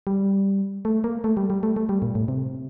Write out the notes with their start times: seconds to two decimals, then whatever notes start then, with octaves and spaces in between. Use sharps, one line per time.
0.07 G3
0.85 A3
1.04 A#3
1.24 A3
1.37 G3
1.50 G3
1.63 A3
1.76 A3
1.89 G3
2.02 A#2
2.15 A2
2.28 C3